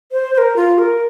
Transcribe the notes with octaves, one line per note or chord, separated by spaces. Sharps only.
C5
C5
A#4
F4
A#4